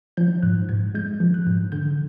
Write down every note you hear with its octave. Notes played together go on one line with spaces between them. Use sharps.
F3 G6
G#2 F#6
G#2 G#6
G#3 G6
F3
F#6
G#2
D3 G6